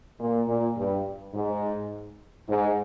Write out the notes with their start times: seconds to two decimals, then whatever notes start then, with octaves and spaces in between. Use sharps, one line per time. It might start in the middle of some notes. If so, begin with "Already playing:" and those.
0.20 A#2
0.48 A#2
0.77 G2
1.34 G#2
2.48 G#2